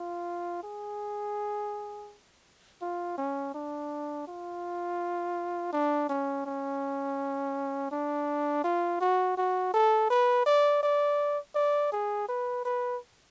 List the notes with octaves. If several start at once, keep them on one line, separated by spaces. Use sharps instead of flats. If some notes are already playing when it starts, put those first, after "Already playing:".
Already playing: F4
G#4
F4
C#4
D4
F4
D4
C#4
C#4
D4
F4
F#4
F#4
A4
B4
D5
D5
D5
G#4
B4
B4